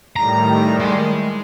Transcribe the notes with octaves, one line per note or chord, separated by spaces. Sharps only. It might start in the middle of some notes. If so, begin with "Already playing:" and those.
A2 D#3 G3 A#5
G#3